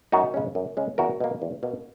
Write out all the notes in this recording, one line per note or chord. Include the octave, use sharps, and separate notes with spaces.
F#2 D#4 F#4
C#3 G#3 C#4
F#2
C#3 G#3 C#4
E2 F#4 A#4
B2 A#3
E2
B2 A#3